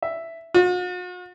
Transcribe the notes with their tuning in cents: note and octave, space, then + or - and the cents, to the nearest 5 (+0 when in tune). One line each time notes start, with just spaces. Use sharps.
E5 +5
F#4 -45